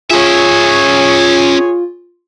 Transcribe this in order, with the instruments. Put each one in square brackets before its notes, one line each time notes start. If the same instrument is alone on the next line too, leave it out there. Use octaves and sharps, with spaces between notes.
[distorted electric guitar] C#4 E5 [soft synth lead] F4 [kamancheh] G#4 C#5